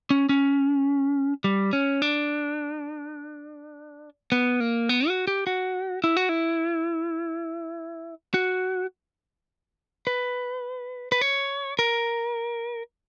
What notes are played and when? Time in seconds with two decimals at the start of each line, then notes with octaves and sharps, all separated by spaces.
0.10 C#4
0.29 C#4
1.44 G3
1.73 C#4
2.02 D4
4.32 B3
4.60 A#3
4.89 B3
5.08 F#4
5.27 G4
5.47 F#4
6.04 E4
6.17 F#4
6.29 E4
8.34 F#4
10.07 B4
11.12 B4
11.21 C#5
11.79 A#4